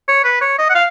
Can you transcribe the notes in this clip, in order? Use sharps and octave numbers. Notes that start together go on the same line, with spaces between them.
C#5
B4
C#5
D#5
F#5
F5